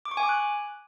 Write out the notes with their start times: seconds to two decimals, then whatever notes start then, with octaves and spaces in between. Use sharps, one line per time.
0.05 D6
0.11 C#6
0.17 G#5
0.23 D6
0.29 F#6